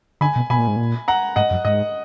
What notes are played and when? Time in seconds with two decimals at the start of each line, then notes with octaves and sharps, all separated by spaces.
0.21 D3 G#5 B5
0.36 B2
0.50 B2 G#5 B5
0.58 A#2
0.68 G#2
0.76 A#2
1.08 F#5 A#5
1.36 G#2 D#5 F#5
1.51 F#2
1.65 G#2 D#5